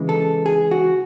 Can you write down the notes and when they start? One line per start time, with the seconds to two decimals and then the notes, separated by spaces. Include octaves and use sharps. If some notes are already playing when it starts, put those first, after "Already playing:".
Already playing: C#3 E3 G#3
0.09 A4
0.46 G#4
0.71 F#4